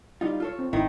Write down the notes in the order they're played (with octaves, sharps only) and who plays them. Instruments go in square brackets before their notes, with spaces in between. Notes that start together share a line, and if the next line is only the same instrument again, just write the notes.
[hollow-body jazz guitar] G3 D#4 F4
F4 A4 C#5
[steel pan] C4
[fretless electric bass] G#1 [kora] D#3 [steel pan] E4